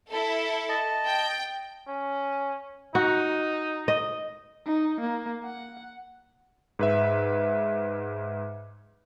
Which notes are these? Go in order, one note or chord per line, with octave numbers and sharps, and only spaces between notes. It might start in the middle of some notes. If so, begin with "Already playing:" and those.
E4 A4
D#5 A5
G5
C#4
D#4 F#4
D#5
D#4
A#3
F#5
G#2 B4 E5